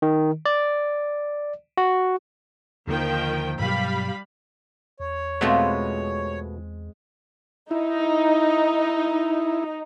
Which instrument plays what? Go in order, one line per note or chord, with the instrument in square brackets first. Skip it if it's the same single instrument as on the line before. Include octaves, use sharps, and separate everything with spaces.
[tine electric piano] D#3
D5
F#4
[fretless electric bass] D#2 D3 A#3 [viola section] D#3 F3 G5
[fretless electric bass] G2 B2 F#3 [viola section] G3 F5 B5
[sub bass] E2 [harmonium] C#5
[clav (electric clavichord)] B2 A3 B3 [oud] G#3 C4 F4
[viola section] D#4 [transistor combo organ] E4